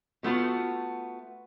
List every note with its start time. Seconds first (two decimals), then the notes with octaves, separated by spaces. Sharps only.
0.23 B2 A3 B3 F4 F#4